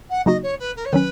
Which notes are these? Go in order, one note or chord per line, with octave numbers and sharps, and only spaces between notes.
F#5
C#3 F#3 A#3 D#4 F#4 D#5
C#5
B4
A#4
C#5
D#3 F#3 C#4 B4